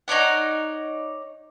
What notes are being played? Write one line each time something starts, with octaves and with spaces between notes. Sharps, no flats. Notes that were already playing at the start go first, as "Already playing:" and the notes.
D#4 C#5 D5 F#5